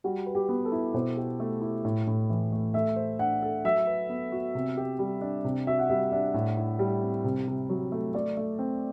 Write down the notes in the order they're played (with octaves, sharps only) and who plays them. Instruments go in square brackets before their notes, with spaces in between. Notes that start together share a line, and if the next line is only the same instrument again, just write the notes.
[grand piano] G3 [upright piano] F#4
[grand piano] B4
[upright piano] G4
[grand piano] B3
[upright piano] A4
[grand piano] E4
[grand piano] B2 [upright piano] C5
[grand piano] G4
A3
E4
A2
A2
E3
A3
[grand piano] A3 [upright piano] E5
[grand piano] C5
[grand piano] D4 [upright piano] F#5
[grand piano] A4
[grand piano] F#3 [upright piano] E5
[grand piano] B4
B3
F#4
C3
G4
G3
D4
C3
[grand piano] F#4 [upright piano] E5
[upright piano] F#5
[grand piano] G3 [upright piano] E5
[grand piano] D4 [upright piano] E5
[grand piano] A2
E4
G3
C4
C3
C3
F#3
A3
[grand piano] A3 [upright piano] D5
[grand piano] A3
C4